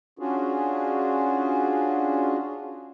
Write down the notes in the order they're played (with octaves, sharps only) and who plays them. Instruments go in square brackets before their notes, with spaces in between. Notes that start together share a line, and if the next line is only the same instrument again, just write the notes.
[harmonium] C#4 D4 F4 F#4 G#4